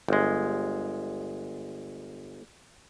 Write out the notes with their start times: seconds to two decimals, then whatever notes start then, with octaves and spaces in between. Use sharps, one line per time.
0.08 G1 G#3